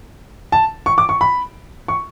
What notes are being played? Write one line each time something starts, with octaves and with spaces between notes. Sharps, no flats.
A5
C#6
D6
C#6
B5
C#6